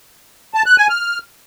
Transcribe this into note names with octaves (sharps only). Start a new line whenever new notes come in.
A5
F#6
G#5
F6